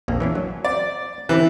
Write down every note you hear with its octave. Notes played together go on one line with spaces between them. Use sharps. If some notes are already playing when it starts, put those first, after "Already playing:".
A#1 F2 A#3
E3 C#4 D4
F#3
C4 D5
C3 E3 C4